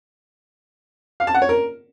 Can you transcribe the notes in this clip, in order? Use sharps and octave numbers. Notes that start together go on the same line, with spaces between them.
F5
A5
F#5
C#5
A#4